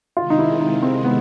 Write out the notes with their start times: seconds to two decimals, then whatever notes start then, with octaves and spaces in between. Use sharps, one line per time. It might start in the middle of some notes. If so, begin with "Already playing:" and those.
0.17 C3 D#3 G#3 F4
0.30 D#4
0.39 E4
0.61 D#4
0.82 C4
1.04 B3